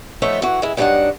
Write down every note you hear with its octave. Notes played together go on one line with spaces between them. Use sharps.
F3 A3 B3 D#4 C#5 E5
E3 F#4
G#3 E4
G2 F3 F#3 D4 D#4 F#5